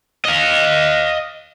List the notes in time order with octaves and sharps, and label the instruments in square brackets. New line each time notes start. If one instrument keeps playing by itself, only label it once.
[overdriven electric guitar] D#5 F5